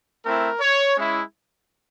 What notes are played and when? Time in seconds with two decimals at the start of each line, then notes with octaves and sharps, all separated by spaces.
0.24 A3 C4 E4 A#4
0.60 C#5
0.96 G#3 C#4 E4